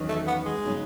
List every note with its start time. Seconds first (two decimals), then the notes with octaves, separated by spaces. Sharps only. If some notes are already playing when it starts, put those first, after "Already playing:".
Already playing: E2 D#3 F#3 C#4
0.08 A3
0.27 B3
0.45 G#3
0.64 C#3 F#3 B3 D#4